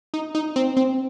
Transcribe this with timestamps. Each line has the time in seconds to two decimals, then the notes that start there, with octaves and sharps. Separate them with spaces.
0.14 D#4
0.35 D#4
0.56 C4
0.77 C4